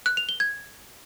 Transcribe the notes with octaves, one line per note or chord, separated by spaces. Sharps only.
F#6
F7
G7
G#6